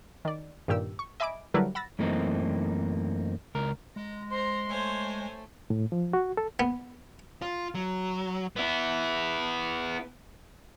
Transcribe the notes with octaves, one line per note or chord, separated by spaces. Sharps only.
D#3 D5
G2 A#2 D#3 G4 E6
C#6
D#5 E5 G#5 B5 D6 D7
D3 F#3 G3 E4 A#4 B4
F#5 B5 E6 A6 A#6
F#2 E3 A3 A#3 C4 D#4
C#2 A#4
G#3 A#5
C5 A#5 C6
A3 C5 C#5 G#5
A2
F3
F#4
A4
B3
F4
F#3
B3 E4